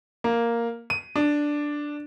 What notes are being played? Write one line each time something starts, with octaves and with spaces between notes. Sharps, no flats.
A#3
D#7
D4